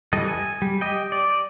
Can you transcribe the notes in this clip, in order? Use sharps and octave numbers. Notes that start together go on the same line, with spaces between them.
E3 G3 A4 D#5
G#5
G3
G4 D#5 G5
D5